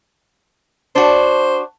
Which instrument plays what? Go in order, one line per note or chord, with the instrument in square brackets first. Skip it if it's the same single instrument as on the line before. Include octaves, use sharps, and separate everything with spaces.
[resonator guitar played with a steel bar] D4 F#4 [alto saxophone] C5